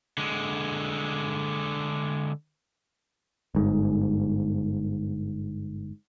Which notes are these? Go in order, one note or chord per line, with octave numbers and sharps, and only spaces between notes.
D3 G#3
G1 G#2